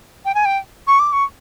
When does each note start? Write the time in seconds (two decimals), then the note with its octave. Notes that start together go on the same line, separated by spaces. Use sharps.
0.25 G5
0.35 G#5
0.45 G5
0.87 C#6
0.99 D6
1.13 C#6